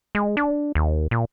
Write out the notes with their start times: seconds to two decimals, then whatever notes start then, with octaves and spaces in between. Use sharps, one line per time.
0.15 G#3
0.37 D4
0.75 D#2
1.11 A#2